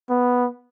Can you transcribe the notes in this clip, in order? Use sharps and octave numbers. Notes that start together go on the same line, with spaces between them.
B3